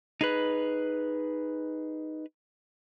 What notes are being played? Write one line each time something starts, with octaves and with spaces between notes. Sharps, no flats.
D#4 G#4 B4